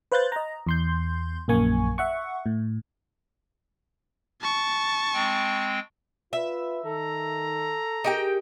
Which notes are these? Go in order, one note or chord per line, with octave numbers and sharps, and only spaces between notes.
B4 C5 F5 F#6 G6 A6
D#5 A#5
E2 C6 G6
A#1 F#2 A#3 G#5 C#6
E5 F#5 C#6
A2
A5 C#6
G#3 C4 G5
F4 B4 E5
D#3 A4 A#5
D#4 G4 G#4 A#4 G5